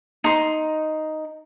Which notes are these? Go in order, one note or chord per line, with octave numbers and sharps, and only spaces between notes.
D#4 C6